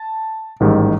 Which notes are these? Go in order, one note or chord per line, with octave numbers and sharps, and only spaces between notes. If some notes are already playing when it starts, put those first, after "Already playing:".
Already playing: A5
A1 G#2 D#3 G3